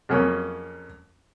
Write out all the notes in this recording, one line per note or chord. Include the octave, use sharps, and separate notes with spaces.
F2 C#3 F#3 A#3 C#4